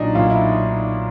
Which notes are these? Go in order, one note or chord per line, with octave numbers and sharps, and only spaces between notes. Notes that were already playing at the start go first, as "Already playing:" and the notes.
Already playing: B1 A#2 F#3 D4 D#4
B1 A#2 F#3 F4
E4